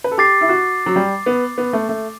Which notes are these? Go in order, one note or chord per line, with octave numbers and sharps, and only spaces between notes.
B4
A4
G4 D6 A6 C7
E4
F#4
F#3
G3
B3
B3
A3
A3